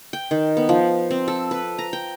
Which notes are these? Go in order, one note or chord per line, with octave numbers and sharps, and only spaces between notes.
G5
D#3
B3
F3
C4
A4
B4
A#5
G5